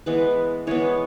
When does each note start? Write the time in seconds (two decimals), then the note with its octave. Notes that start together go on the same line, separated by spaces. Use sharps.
0.06 E3 G#3 B3 B4
0.67 E3 G#3 B3 C#5